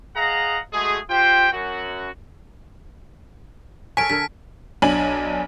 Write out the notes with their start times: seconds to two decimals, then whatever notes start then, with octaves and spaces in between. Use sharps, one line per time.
0.16 G#4 D#5 F5 F#5 A#5
0.73 G#3 A3 F#4 G#4
1.10 F4 G4 C5 G5
1.53 F#2 F#4
3.97 A4 A#4 C#5 G#5 B6 D7
4.10 D3 A4 A#4 B6
4.82 B1 D4 G#5 F#7